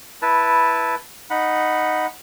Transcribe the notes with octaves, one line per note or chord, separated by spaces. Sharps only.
E4 B4 A5
D#4 F#5 B5